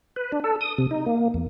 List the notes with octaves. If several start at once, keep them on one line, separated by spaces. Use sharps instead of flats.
B4
D4
A4
D#6
C3
D#4
A#3
E2